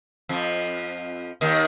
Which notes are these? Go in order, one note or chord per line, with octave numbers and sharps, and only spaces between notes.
F2 F3
D#2 D#3